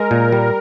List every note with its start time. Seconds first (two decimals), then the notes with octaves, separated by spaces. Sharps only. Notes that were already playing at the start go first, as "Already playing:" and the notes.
Already playing: G#3 A#4
0.11 A#2
0.32 G3